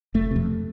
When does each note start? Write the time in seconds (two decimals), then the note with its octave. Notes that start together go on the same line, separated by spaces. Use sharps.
0.14 F1 A3
0.31 F2 C3